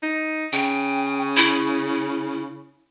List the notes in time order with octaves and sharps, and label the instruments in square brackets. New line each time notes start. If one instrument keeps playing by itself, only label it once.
[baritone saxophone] D#4
[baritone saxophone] C#3 [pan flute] G5
[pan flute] E4